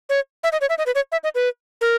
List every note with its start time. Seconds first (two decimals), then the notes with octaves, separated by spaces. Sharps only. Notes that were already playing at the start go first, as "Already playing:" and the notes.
0.09 C#5
0.44 E5
0.52 D#5
0.61 C#5
0.69 E5
0.78 D#5
0.86 B4
0.95 C#5
1.12 E5
1.24 D#5
1.35 B4
1.81 A#4